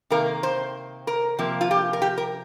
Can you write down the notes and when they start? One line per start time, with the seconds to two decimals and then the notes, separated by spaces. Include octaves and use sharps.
0.10 C3 D#3 A#3 A#4
0.43 C5
1.07 A#4
1.39 C3 F3 A#3
1.61 F4
1.71 G4
1.93 A#4
2.02 G4
2.18 A#4